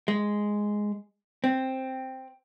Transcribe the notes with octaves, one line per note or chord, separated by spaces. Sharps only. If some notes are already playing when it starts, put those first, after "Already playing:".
G#3
C4